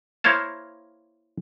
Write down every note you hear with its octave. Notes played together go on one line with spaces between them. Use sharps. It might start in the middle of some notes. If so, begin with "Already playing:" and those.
A#3 E4 C5 C#5 F5 A5